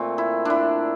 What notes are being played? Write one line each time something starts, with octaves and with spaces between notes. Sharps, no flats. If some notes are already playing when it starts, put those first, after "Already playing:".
Already playing: A#2 A3 C4
E4
D4 E4